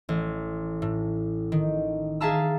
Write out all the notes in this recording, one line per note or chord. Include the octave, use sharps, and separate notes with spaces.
A1
A2
D#3
G#4 E5 F5 A5 A#5 E6